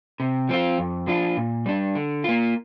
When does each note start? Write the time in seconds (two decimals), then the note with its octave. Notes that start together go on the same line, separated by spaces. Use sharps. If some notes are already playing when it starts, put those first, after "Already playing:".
0.20 C3
0.49 F3 C4 F4
0.78 F2
1.07 F3 D4 F4
1.37 A#2
1.66 G3 D4
1.95 D3
2.24 A#3 F4